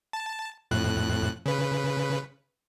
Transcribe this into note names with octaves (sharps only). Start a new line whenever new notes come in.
A5
F2 A2 F#6
C#3 B4